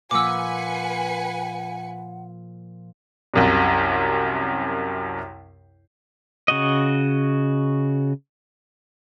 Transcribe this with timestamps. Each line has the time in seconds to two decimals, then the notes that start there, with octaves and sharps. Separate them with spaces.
0.11 A#2 F3 B4 F#5 G#5 D6 E6 C#7
3.34 C2 F#2 C3
6.48 C#3 F#4 D#5